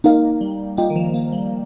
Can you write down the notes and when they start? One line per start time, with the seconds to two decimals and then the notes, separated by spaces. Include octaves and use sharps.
0.04 A#3 D#4 A#4 F5
0.41 G3
0.77 A#3 F4 D#5 G5
0.90 D#3
0.96 F3
1.14 A#3
1.32 G3